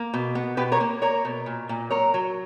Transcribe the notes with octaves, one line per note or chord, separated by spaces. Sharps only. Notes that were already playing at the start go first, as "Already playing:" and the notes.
Already playing: A#3
B2
B3
B2 G4 B4
A#4 C#5
A#3
A#3 A#4 C#5
B2
A#2
A#2
F#3 A#4 C#5
F#3